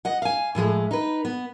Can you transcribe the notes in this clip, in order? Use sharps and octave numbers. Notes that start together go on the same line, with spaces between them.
D#5 F#5
F5 G#5
A2 F3 G#3 A3
D#4 B4
B3